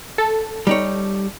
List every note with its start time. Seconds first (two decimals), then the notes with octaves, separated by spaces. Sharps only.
0.18 A4
0.67 G3 D#4 C#5